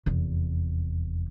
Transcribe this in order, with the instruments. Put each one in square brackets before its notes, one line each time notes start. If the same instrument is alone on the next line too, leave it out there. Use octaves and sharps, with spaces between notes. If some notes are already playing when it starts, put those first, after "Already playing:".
[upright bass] F1 E2